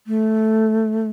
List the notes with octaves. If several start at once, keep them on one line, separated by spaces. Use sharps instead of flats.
A3